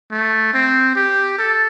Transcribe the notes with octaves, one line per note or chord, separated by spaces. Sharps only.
A3
C4
G4
A4